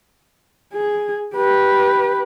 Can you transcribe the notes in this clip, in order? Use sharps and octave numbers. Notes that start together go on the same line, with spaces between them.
G#4
G4 B4